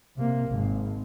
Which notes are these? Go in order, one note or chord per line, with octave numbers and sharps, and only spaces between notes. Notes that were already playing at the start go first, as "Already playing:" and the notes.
C3 A#3
G#1